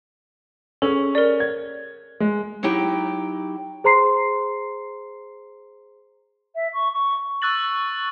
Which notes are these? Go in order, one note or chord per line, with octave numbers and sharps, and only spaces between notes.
C#4 G#4 A4
A#4 D5
G#6
G#3
F#3 D#4 E4 G4 G5
G#4 C5 A#5 C6 C7
E5
C#6
C#6
C#6 E6 F#6 A6 F#7